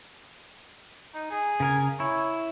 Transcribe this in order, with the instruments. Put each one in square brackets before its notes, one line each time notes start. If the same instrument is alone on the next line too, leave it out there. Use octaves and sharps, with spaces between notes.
[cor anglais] D#4
G#4
[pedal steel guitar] C#3 A#4 G#5
[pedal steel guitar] E4 [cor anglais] C#5